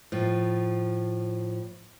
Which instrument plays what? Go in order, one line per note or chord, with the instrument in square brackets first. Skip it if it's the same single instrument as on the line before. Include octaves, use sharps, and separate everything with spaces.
[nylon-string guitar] A2 F3